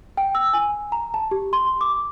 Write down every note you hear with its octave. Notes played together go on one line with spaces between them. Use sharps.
G5
E6
G#5
A#5
A5
G4
C6
D6